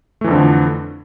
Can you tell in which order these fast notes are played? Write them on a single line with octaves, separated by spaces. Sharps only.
A3 E3 F2 D3 F3